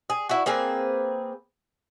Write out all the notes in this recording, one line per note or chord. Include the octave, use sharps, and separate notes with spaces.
G#4
E4 F#4
A#3 C4 G#4 B4